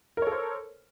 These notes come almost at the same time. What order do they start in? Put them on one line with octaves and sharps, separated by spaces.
A#4 C#5 A4 C5